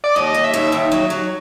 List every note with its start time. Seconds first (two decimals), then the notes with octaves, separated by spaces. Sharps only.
0.04 D5
0.15 D#2 D#5
0.34 D#2
0.44 E5
0.54 D#2
0.72 D#3
0.92 F#3
1.10 F#3